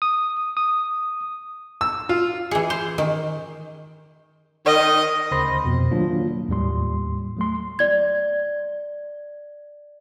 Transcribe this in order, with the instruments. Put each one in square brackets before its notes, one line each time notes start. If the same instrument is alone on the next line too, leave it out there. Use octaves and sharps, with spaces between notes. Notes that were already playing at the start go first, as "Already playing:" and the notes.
[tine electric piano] D#6
D#6
[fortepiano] E6
F4
[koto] E3 G#4
C5
D#3
[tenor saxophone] D#3 [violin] D#5
[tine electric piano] D2 C#3 C5 B5 C6 A#6
F2 B2
D#3 F#3 A#3 D4 F4
D#2 A2 G3 C6
F#3 A3 C6
[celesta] D5 G#6